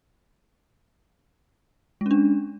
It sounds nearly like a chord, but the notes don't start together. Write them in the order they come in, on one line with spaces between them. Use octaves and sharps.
G#3 C#4 D4